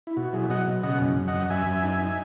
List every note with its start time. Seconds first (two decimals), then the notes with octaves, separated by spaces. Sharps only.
0.07 E4
0.17 B2 F#4
0.33 F#3 E4 G#4
0.50 F#3 D#5 F#5
0.67 B2
0.83 C#3 D#5 F#5
1.00 F#2
1.17 F#2
1.28 D#5 F#5
1.34 F#2
1.50 F#2 E5 G#5
1.67 F#2
1.83 D#4
2.00 D#4